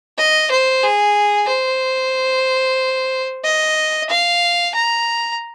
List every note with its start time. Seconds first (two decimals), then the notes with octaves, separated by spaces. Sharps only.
0.18 D#5
0.51 C5
0.83 G#4
1.48 C5
3.44 D#5
4.10 F5
4.75 A#5